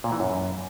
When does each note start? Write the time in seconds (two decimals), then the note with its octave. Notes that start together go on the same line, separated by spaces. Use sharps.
0.04 A#2
0.12 E3
0.20 F#2